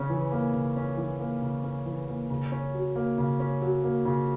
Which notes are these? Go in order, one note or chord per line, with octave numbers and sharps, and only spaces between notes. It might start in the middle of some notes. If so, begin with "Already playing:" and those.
Already playing: C#3 C#4
E3
A#3
C#3
C#4
E3
A#3
C#3
C#4
E3
A#3
C#3
C#4
F#3
A#3
C#3
C#4
F#3
A#3
C#3